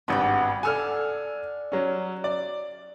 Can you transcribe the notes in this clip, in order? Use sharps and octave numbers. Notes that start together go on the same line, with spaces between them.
G#1 G2 B3 F#4 G4
D4 A4 F#5 G#5 E6 F6
F#3 C#4
D5